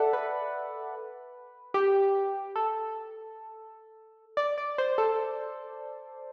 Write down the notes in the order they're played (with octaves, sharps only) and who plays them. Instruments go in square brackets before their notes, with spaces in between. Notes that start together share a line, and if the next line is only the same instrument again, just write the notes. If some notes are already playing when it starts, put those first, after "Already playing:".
Already playing: [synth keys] A4 D5 E5 F#5
B4
G4
A4
D5
D5
C5
A4